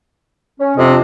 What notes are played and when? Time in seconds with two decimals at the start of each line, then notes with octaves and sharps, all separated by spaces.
0.60 C#4
0.77 F2 C3 D4 D#5